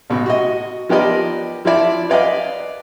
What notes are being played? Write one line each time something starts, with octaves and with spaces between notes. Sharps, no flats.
A1 B2
F#4 D#5
F3 B3 G4 A#4 D5 D#5
F3 E4 D5 E5
B4 D5 D#5 F5